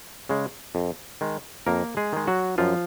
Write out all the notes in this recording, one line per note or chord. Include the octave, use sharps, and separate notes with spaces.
C#3 G#3
F2
D#3 G#3
F2 A#3 A#4
G#3 G#4
D#3 G#3
F#3 F#4
F#2 F3 F4